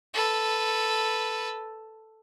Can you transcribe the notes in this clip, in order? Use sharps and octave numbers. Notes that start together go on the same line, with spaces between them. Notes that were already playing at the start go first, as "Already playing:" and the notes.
A4 B4